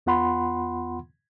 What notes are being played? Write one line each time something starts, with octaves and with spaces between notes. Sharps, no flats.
E2 B3 F4 F#5 B5 C6